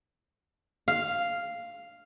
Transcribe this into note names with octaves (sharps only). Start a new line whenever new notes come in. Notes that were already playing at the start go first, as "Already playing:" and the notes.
F5